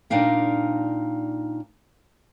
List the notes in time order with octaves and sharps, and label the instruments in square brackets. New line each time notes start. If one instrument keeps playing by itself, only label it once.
[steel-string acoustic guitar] A#2 D4 D#4 A#4 F5 G5